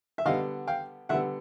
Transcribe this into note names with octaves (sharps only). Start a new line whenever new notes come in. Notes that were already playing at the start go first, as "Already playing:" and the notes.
E5
D3 G3 B3 D#5 F5
F5 G5
D3 G3 B3 E5 F#5